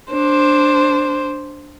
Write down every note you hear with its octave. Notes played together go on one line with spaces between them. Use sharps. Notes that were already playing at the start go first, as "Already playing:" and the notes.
D4 C5